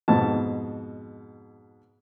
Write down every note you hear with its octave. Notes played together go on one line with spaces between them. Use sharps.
F2 G#2 B2 A5